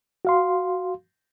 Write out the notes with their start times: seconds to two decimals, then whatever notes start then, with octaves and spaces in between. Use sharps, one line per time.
0.25 F#4 F5 C6